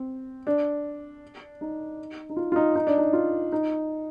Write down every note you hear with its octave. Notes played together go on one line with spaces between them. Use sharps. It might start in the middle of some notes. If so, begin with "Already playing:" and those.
Already playing: C4
D4
D#4
D#4
F4
F4
D#4
D#4
D4
D#4
F4
D#4